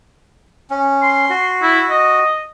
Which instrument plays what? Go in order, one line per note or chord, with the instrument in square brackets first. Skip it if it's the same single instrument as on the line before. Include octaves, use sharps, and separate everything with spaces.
[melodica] C#4
[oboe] C6
[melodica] F#4
[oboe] E4
D#5